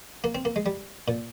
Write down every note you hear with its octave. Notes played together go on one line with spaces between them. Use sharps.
A#3
C4
A#3
G#3
G3
A#2